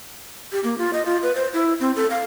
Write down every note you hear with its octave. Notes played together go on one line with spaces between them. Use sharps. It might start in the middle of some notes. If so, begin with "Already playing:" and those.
G4
A#3
F4
D#5
F4
B4
C5
E4
C4
A4
F5